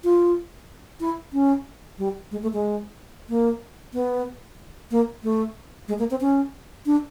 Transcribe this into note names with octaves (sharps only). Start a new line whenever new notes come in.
F4
E4
C#4
G3
G#3
A3
G#3
A#3
B3
A#3
A3
G#3
A#3
C4
C#4
D4